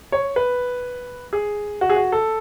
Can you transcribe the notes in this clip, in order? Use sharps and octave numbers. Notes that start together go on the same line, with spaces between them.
C#5
B4
G#4
F#4
G#4
F#4
A4